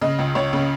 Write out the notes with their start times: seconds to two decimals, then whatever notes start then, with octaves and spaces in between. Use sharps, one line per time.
0.01 C#3 D#5
0.19 C#2
0.35 C#2 C#5
0.53 C#3